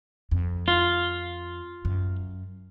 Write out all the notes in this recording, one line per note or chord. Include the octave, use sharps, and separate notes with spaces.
F2
F4
F#2